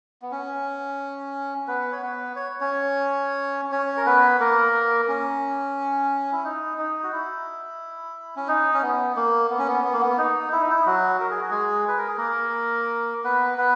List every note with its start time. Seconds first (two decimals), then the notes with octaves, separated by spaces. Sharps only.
0.22 B3
0.32 C#4
1.68 B3 B4
1.93 C#5
2.02 B3 B4
2.36 C#5
2.60 C#4 C#5
3.72 C#4 C#5
3.97 A#4
4.06 B3 B4
4.40 A#3 A#4
5.08 C#4
6.32 E4
6.44 D#4
6.78 D#4
7.03 F#4
7.12 E4
8.36 C#4
8.48 D#4
8.74 C#4
8.82 B3
9.16 A#3
9.50 B3
9.59 C#4
9.67 B3
9.84 B3
9.93 A#3
10.01 B3
10.18 D#4
10.52 E4
10.62 D#4
10.71 E4
10.86 F#3 F#4
11.21 A#4
11.31 G#4
11.41 F#4
11.51 G#3 G#4
11.88 B4
11.98 A#4
12.07 G#4
12.17 A#3 A#4
13.24 B3 B4
13.58 B3 B4